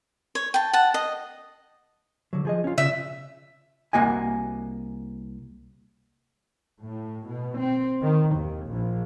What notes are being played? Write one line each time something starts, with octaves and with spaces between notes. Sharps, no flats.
C#5
G5 A5
F#5 A5
D#5
D3 F#3
F3 G#4 D#5
C#4 F4
C#3 E5
C2 G#2 A#3 F#4 D#5 G#5
A2
B2
C4
D#3
D#2
A#1